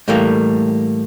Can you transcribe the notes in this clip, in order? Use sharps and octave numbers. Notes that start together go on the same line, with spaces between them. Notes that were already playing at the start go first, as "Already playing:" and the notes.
A2 E3 G3 A3 A#3